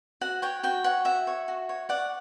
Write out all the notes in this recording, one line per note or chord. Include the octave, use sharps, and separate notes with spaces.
F#4 F#5
C#5 G5
F#4 G5
C#5 F#5
F#4 E5
C#5
F#4
C#5
D5 F#5